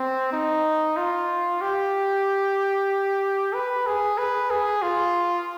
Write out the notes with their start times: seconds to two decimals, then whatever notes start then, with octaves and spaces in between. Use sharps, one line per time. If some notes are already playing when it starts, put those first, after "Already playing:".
Already playing: C4
0.32 D#4
0.97 F4
1.61 G4
3.54 B4
3.86 G#4
4.18 B4
4.50 G#4
4.82 F4